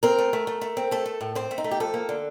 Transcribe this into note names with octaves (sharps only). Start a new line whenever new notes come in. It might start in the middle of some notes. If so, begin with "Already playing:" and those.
C4 A#4
A3
A3
A3
A3
C4
A3 A4
A3
A2
C4 C5
A3
D#4
A3
G4
F3 A4
A#3
D3